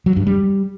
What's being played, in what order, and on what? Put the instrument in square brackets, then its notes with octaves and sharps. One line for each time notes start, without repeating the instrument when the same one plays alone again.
[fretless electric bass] F#3
G2
G3